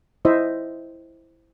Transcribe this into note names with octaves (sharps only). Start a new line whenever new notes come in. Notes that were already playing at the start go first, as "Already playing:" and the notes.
E4 C5 D#5 E5